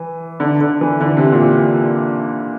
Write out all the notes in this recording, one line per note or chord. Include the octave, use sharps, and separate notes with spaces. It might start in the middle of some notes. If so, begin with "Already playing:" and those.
Already playing: E3
D3
D3
E3
D3
C3
A#2